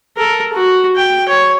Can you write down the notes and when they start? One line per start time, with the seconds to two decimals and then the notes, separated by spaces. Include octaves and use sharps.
0.17 A4 A#4
0.53 F#4
0.96 G5
1.28 C#5